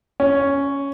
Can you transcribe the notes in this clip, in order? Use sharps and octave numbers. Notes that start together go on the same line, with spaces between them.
C#4